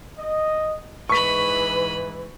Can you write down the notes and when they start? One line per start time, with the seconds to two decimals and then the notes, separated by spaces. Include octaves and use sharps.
0.19 D#5
1.09 G#2 E3 B4 D#5 B5 C#6 B6